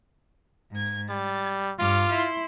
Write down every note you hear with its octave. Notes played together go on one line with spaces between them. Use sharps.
G#2 G#6
G3 A6
G2 F4 D6 F6
E4 C6